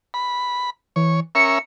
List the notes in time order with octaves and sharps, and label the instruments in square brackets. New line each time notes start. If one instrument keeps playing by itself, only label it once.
[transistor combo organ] B5
[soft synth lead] E3 [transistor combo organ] C#5
[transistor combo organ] C#4 A#4 E5 [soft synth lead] C#7